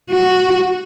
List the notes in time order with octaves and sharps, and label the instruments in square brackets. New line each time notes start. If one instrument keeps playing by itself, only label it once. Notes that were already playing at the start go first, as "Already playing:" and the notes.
[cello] F#4